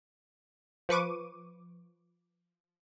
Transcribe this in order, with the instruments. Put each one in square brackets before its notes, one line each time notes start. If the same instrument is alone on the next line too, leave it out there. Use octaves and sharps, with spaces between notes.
[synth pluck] F3 B4 C#6 D6 D#7